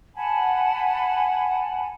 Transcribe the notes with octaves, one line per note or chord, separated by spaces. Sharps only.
F#5 G#5 A5 B5